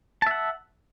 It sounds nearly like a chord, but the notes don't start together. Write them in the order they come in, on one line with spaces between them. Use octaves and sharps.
A5 E5 F#5